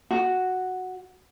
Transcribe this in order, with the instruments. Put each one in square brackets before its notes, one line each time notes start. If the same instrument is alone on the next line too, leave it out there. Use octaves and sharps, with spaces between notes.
[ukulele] F#4